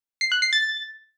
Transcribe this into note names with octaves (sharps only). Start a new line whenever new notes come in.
C7
F#6
C7
A6